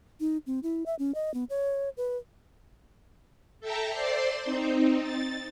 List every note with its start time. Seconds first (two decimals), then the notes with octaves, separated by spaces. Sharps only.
0.20 D#4
0.47 C4
0.63 E4
0.86 E5
0.99 C#4
1.15 D#5
1.34 B3
1.50 C#5
1.97 B4
3.60 A4 E5 G5 A5 A#5
3.90 C5 D5 C6
4.45 C4 D#4
5.01 A6